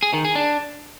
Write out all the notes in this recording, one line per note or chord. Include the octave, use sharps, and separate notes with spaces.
G#4
D#3
G#4
D4